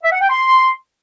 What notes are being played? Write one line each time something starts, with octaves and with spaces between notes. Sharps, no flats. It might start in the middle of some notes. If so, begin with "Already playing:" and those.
E5
F#5
G5
C6